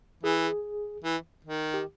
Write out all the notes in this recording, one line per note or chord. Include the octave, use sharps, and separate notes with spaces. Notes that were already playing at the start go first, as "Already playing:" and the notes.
E3 G#4
E3
D#3
G4